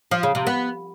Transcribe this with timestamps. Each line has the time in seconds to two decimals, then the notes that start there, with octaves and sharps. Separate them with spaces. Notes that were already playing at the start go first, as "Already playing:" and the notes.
0.11 F3
0.23 C#3
0.35 C3
0.47 B3